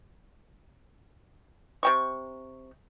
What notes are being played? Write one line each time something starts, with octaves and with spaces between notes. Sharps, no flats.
C3 G5 C#6